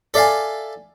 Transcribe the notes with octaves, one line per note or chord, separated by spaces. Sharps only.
A4 D5 E5 F5 G#5